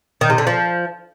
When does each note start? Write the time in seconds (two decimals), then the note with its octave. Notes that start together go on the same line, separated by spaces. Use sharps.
0.21 D#3
0.30 C3
0.38 D3
0.47 F3